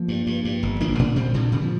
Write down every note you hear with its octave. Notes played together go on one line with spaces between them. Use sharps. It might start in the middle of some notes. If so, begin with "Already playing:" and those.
Already playing: F3 A#3
G2
G2
G2
G1
A#1 A#3 D4
A#2
A#2 G3 C4
A#2 D3 G3
A#2
F3